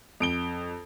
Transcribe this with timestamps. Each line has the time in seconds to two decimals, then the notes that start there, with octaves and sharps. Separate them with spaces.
0.20 F2 D7 G7